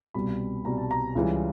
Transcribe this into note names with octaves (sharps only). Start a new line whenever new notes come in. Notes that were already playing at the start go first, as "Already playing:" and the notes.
C2 B2 G3 B5
C2 B2 G3 A#5
A5
A#5
C#2 C#3 E3 G3